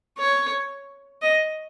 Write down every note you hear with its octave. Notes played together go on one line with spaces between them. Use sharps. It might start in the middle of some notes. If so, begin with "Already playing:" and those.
C#5
D#5